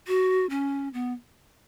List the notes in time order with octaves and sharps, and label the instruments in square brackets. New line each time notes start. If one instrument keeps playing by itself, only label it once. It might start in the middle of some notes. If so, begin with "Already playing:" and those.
[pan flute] F#4
C#4
B3